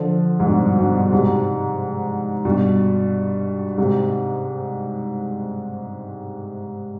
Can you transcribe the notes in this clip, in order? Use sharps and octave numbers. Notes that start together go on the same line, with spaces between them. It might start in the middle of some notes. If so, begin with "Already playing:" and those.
Already playing: D3 F3
G#2
G2 B2
G2 B2
G#2 C3
G2 B2
G#2 C3